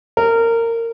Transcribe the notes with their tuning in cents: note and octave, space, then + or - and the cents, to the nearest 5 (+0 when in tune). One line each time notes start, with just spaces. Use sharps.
A#4 -20